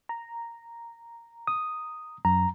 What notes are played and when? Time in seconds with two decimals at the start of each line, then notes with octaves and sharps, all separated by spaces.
0.09 A#5
1.47 D#6
2.25 F#2 A#5